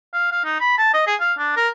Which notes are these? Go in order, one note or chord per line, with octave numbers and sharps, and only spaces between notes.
F5
F5
D#4
B5
A5
D#5
G#4
F5
D4
A#4